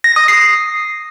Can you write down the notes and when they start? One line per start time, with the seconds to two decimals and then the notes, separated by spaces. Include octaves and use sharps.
0.04 A#6
0.16 D#6
0.28 C7